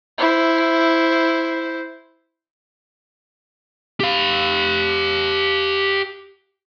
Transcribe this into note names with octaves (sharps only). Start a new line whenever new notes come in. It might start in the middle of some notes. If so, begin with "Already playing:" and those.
E4 C5
G4 F5